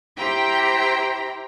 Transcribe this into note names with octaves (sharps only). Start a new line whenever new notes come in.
E4 G4 C5 G5 A#5